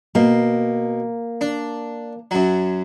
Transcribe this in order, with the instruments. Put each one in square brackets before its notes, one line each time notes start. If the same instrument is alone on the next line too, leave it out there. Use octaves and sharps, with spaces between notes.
[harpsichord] B2 [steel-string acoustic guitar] A#3
[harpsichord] D4
F#2 F#3